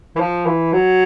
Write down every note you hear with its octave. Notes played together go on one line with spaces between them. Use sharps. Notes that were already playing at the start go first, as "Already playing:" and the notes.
E3
F3
E3
F#3